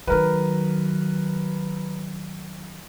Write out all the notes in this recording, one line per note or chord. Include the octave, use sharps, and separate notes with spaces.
D#3 F#3 A#4 B4